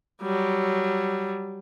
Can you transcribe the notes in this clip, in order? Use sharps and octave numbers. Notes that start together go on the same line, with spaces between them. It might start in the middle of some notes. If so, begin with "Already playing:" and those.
F#3 G3